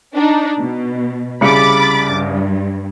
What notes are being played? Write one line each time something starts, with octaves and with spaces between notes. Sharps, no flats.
D4 D#4
B2
C2 C#3 B5 D6 A6 C#7
G2